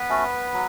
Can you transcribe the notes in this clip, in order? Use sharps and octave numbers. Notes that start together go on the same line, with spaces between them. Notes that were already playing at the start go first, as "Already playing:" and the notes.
Already playing: B3 B4
A3 C#4 F#4
F#3